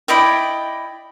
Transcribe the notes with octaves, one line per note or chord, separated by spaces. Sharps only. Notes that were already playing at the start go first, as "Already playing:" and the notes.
E4 D5 D#5 G5